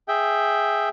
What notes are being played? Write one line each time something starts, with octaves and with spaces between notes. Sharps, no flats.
G#4 E5 G5